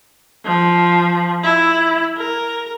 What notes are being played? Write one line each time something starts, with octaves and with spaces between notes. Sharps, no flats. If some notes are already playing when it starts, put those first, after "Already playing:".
F3
E4
A#4